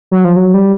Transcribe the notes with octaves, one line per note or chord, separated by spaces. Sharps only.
F#3
F3
F#3
G3